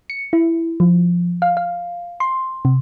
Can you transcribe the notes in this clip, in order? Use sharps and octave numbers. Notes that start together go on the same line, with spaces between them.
C#7
E4
F3
F5
F5
C6
C3